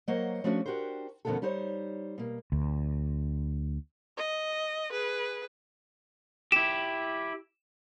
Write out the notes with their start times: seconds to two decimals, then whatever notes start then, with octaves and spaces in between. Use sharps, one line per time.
0.08 F#3 A#3 C5 C#5 D#5 F#5
0.44 F3 A3 C#4 D4 F#4
0.66 D4 D#4 F#4 G4 A#4 C5
1.25 F2 B2 D3 A#3 B3 A4
1.42 G3 D#4 C5 C#5
2.18 B2 A#3
2.52 D2
4.17 D#5
4.92 G#4 B4
6.52 E4 G4 E7